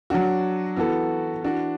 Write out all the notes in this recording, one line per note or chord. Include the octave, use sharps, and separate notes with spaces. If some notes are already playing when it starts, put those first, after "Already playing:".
F#3 D4 F#4
E3 B3 F#4 A4
E3 D4 F#4